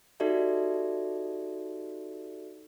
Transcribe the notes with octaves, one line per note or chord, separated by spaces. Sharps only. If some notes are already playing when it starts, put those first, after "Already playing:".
D#4 F#4 G4 A4 D5 E5